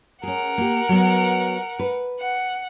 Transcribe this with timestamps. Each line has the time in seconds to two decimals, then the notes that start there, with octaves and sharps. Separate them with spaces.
0.23 C#4 G#4 A#4 F#5
0.58 A#3 G4
0.89 F#3 B3
1.79 B4
2.19 F#5